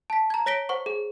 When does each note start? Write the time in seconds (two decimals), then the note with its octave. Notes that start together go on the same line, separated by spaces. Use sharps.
0.10 A5 B6
0.30 A#5 G#6
0.46 C#5 A#6 B6 D7 G7
0.69 C5 F#5 C#6
0.86 G#4